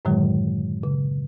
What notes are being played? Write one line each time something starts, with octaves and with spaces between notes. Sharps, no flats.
F#2 A2 D3 D#3 F#3 G#3
C#3